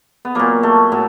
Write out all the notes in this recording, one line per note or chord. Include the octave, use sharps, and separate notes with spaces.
B3
A#2 F#3 A#3
A3
A2 F#3